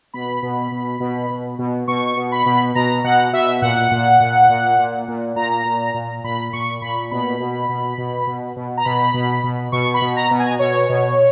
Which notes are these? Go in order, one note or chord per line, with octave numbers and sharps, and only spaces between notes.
B2 B5
B2
B2
B2
B2
B2
B2 C#6
B2
B5
B2
B2 A#5
B2 F#5
B2 E5
A#2 F#5
A#2
A#2
A#2
A#2
A#2
A#2 A#5
A#2
A#2
A#2 B5
A#2 C#6
A#2 B5
B2 B5
B2
B2
B2
B2
B2
A#5
B2 B5
B2
B2
B2 C#6
B5
B2
A#5
B2
G#5
B2 C#5
B2